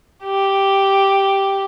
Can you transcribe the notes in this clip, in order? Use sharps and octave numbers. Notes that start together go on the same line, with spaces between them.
G4